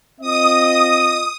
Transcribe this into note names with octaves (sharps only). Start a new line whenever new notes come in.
C4 F4 D#5 D#6